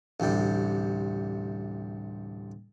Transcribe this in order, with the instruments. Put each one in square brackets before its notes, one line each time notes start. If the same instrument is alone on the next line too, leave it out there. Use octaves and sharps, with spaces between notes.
[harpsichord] A1 D2 C3 G3